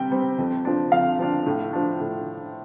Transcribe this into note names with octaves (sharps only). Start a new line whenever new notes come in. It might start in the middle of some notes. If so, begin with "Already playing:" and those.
Already playing: C3 G3 C4 G5
G3 C4
F2
F3 D4
F2 F5
F3 D4
A2
F3 D4
A2